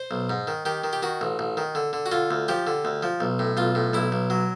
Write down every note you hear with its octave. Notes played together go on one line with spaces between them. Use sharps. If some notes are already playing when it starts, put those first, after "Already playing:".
Already playing: C5
B1
G#2
D#3
D#3 G4
D#3
G4
D#3 F#4
A1
A1
D#3
D3
D3
F#4
D3 F4
D2
F3 G4
D3
D2
F3
B1
A2
B1 F4
A2
B1 E4
B1
F#3